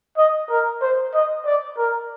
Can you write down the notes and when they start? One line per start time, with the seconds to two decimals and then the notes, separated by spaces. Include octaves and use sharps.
0.18 D#5
0.49 A#4
0.82 C5
1.14 D#5
1.45 D5
1.77 A#4